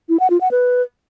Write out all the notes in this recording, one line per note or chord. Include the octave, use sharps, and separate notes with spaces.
E4
F#5
F4
F#5
B4